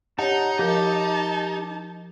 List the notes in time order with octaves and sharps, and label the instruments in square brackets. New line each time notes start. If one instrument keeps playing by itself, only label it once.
[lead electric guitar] D#4 [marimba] G4 C#5 [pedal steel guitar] D#5 F#5 A5
[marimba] F3 A#4 [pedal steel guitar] G4 G6 [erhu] A5